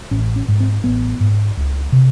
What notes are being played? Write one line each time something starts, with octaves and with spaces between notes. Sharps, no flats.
A1 C#4
C#4
G#2
C4
A1 B3
G#2
C#2
C3